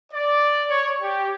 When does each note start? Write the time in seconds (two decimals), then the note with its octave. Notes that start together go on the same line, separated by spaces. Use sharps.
0.13 D5
0.69 C#5
1.02 G4